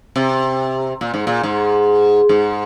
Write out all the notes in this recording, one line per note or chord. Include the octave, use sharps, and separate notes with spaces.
C3
A#2
G#2
A#2
G#2
G#2